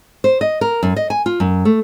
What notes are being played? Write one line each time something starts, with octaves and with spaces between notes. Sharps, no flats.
C5
D#5
A#4
F#2
D#5
G#5
F4
F#2
A3